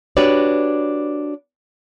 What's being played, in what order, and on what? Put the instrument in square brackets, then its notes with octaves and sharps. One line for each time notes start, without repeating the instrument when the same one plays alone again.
[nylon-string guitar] D4 F#4 G4 B4 C#5 D5